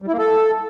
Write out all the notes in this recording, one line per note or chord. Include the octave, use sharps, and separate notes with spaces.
G3
E4
A#3
A4